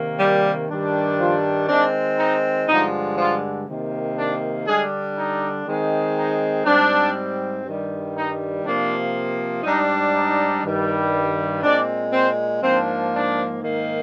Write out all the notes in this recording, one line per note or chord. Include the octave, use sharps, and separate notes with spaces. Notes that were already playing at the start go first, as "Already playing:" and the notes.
Already playing: C3 D#3 A#3
G3 G4
G2 D#3 G3 D4
F3 F4
D#3 G#3 C4 D4
D#4
G2 D3 F3 G#3 D#4
F3 F4
C3 D#3 A#3
D4
D3 G3 G#3 D4 G#4
D#4
D#3 G#3 C4
D#4
G#2 G3 C4 D4
G2 D#3 G3
D#4
C3 F3 A#3 D4
G#2 G3 D4 D#4
D#4
G2 D#3 G3
A#2 G#3 C4 D4 D5
C4 C5
G#2 F3 A#3 C4 D4 C5
D4
G#2 D#3 A#3